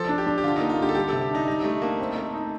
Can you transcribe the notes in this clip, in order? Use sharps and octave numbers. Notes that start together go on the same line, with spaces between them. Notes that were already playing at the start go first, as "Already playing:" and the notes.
Already playing: F3 A4
D4
G4
D4
G4
D3 F4
A#3 D#4
F4
D3 G4
A4
G3 G4
C3 A4
G4
D4 D#4
G3 D#4
G3 A3
A#3 D4
C4
A3
D#4